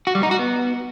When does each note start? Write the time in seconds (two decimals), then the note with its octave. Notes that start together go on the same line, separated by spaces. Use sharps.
0.07 F#4
0.15 G3
0.23 D#4
0.31 F#4
0.39 B3